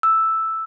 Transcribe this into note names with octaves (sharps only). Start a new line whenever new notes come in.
E6